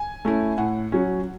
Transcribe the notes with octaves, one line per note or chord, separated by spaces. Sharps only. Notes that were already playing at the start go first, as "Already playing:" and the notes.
Already playing: G#5
A3 C#4 E4
A2 F#5
F#3 C#4